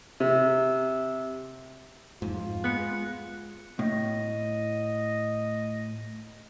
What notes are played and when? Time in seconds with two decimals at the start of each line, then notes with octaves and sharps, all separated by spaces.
0.20 C3
2.22 F2 G#2 F4
2.64 G#3 B3 F#6 C#7
3.79 A2 D#5